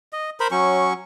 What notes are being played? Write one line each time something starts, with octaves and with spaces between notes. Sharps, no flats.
D#5
A#4 C5 B5
F#3 C#4 C#6